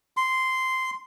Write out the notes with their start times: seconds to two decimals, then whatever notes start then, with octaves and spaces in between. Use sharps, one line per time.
0.17 C6